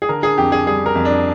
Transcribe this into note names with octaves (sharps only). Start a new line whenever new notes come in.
G#4
D3 A#4
G#4
F2 G4
G#4
G3 G#4
A#4
F2
D4